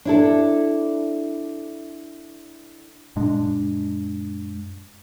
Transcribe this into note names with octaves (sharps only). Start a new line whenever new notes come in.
D4 E4 A4
F#2 A#2 G#3 D4